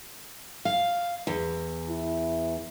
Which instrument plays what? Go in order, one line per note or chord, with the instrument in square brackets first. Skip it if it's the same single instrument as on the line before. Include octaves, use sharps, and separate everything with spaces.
[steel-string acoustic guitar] F5
E2
[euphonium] E4